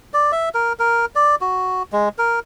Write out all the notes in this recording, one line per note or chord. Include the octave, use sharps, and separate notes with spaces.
D5
E5
A#4
A#4
D5
F#4
G#3
A#4